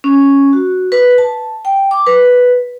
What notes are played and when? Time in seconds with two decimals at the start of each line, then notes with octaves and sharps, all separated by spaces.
0.04 C#4
0.53 F#4
0.92 B4
1.18 A5
1.65 G5
1.91 D6
2.07 B4